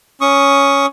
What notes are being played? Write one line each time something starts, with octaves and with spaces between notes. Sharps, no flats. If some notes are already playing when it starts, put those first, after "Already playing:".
C#4 C#6 D#6